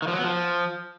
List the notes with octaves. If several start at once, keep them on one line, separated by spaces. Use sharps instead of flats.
D#3
F3
F#3
B3
F3